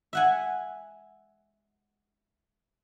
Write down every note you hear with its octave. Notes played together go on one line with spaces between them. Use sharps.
E5 F#5 G#5